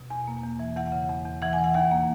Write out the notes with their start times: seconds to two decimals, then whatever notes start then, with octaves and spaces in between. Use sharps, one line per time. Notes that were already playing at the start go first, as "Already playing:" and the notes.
Already playing: B2
0.10 E2 G#5
0.27 A#3
0.44 E2
0.59 E3
0.77 E2 F#5
0.92 C#3
1.09 E2
1.26 E2
1.42 E3 F#5
1.53 G#5
1.58 E3
1.64 F#5
1.74 D#2 F#5
1.91 A#3